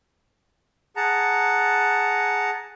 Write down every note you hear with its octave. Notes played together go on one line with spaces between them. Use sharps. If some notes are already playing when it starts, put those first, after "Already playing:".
G#4 F#5 A5 A#5